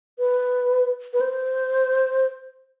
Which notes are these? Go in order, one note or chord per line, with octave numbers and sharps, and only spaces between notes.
B4
B4
C5